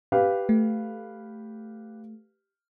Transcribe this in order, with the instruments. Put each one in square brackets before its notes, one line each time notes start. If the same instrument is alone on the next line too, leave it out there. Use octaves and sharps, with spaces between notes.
[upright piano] G4 B4 F5
[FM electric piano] A3